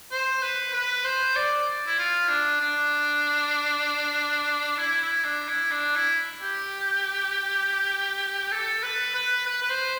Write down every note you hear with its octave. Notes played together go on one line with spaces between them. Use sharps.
C5
B4
B4
C5
D5
E4
F4
D4
D4
E4
E4
D4
E4
D4
E4
G4
A4
B4
B4
B4
B4
C5